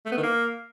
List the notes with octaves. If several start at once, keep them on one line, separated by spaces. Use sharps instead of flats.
A3
B3
D#3
A#3